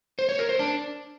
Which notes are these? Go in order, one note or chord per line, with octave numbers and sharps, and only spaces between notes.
C5
C#5
A#4
C5
D4